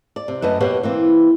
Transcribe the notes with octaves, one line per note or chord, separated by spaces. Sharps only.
D5
C3
F#2 A3 B4 D#5
B2 A#3 G4 B4 C#5 F#5
E3 A#3 C4